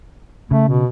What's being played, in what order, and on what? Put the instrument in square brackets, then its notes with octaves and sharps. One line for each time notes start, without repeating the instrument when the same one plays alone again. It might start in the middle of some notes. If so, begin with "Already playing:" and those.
[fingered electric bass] C#3 [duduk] A3
[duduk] B2